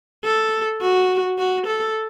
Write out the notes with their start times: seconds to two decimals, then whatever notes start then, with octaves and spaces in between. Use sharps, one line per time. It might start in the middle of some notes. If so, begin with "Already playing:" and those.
0.24 A4
0.81 F#4
1.38 F#4
1.67 A4